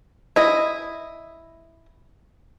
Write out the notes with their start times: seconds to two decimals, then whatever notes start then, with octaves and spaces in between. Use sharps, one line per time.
0.36 E4 D#5